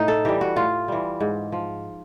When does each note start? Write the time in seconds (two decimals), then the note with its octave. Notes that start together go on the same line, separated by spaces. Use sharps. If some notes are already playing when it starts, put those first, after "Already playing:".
Already playing: A2 D#4
0.08 A4
0.25 E3 G3 G4
0.41 F#4
0.56 A2 F4
0.88 E3 G3
1.20 G#2
1.52 F3